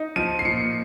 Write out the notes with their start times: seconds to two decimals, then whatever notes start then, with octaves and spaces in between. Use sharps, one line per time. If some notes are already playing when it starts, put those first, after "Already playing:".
Already playing: D#4
0.16 F3 D#7
0.39 C7
0.45 A#2 C#7